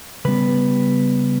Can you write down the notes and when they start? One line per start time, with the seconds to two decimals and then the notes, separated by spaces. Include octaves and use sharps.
0.25 C#3 G3 B3 B4